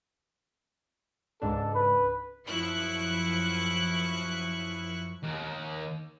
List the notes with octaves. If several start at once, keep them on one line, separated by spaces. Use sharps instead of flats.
C#2 G#2 D4 A4
B4
F#2 F3 E4 C#6 F#6
D#2